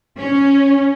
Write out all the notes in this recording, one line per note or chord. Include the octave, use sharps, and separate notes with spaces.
C#4